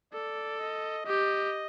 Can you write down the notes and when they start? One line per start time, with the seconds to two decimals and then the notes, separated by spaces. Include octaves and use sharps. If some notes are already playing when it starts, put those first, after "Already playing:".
0.13 A4 D5
0.60 D#5
1.06 G4 D#5